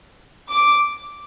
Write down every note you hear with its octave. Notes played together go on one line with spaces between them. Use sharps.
D6